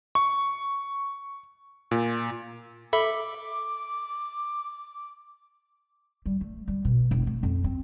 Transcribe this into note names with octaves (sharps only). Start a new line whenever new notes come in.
C#6
A#2
A4 E5 B5 D6
G3
A3
G3
B2
F1
A3
F2
C4